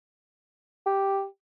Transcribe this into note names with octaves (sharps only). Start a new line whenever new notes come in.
G4